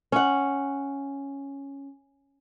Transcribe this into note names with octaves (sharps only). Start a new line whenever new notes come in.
C#4 F#5